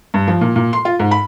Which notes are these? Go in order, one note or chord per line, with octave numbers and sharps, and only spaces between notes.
G2
F3
A#2
A#2
C6
F4
G#2
B5